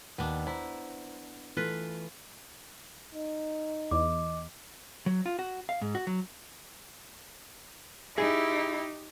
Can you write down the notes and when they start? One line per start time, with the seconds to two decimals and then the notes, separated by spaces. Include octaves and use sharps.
0.18 D#2 B3 D4
0.47 E4 C5 A#5
1.57 E3 A3 F4 B4
3.14 D#4
3.91 E2 D#5 D6
5.06 F#3
5.26 F4
5.39 F#4
5.69 F5
5.81 G#2
5.95 F#4
6.07 F#3
8.18 D#4 E4 G4 G#4